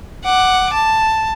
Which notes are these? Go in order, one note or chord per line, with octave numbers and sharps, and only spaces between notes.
F#5 D6
A5